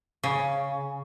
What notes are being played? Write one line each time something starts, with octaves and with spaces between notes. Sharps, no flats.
C#3